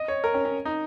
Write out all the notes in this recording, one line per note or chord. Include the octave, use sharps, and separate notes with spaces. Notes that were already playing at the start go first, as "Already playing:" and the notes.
Already playing: D#5
C#5
A#4
C#4
C#4
D#4